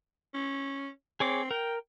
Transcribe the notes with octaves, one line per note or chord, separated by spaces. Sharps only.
C#4
C4 G#4 C#5 D6
A#4 G5